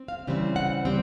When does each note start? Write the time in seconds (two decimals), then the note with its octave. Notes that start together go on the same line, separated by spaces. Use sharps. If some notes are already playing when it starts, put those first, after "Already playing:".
Already playing: C4
0.08 F5
0.27 C#3 E3 G3 C4
0.56 F#5
0.85 G3 C4